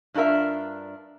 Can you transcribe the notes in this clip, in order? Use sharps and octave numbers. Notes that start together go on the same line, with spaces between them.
G2 D4 F4 A#4 E5